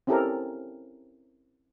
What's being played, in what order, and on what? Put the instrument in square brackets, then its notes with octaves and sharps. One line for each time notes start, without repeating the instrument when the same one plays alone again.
[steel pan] C4 C#4 E4 G4 A4 A#4